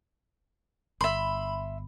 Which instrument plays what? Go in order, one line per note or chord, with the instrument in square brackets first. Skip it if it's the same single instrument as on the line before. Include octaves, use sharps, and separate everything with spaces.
[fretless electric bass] G1 [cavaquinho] E5 C6 [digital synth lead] B5